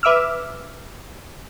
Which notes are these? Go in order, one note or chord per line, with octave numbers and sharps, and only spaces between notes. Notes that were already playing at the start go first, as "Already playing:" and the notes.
B4 E5 D6 E6 F6